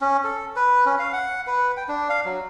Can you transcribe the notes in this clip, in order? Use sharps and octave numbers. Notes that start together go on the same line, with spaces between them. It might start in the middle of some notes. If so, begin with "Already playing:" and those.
C#4
A4
B4
C#4
F5
F#5
B4
G5
D4
F5
F#3